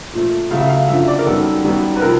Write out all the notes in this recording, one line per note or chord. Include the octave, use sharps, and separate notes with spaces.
A#2 F3 A3
C#3 F#3 A3 F5
E5
F5
F#2 D3 F3 E5
D5
A#4
F#2 D#3 G3 B3 A4
F#2 D#3 G3 B3
B4
C3 F3 A#4